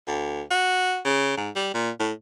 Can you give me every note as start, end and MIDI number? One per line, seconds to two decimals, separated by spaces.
0.08 0.42 38
0.51 0.99 66
1.05 1.37 49
1.37 1.50 44
1.56 1.74 55
1.75 1.91 46
2.00 2.12 45